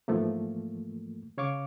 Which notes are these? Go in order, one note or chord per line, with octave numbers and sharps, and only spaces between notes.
G#2 E3 F3 A3 A#3
C#3 C#5 F5 C#6 D6